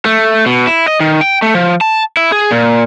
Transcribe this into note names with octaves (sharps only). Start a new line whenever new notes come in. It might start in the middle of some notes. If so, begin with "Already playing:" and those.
A3
B2
E4
D#5
D#3
G5
A3
F3
A5
E4
G#4
A#2